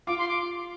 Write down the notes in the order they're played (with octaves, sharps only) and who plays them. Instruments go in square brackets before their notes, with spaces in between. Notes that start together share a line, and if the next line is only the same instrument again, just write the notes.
[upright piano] F4 [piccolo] D6
[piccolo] C6
D6